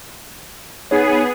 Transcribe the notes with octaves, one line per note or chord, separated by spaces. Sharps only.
B3 D#4 G#4 C#5